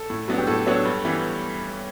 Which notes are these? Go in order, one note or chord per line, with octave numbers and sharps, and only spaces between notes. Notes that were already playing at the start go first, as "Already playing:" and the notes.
Already playing: A4
A2
F#3 B3 D4
G4
A2 A4
F#3 B3 D4 C#5
G2
E3 G3 B3